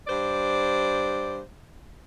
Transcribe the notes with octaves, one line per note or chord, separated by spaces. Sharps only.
G2 C5 D5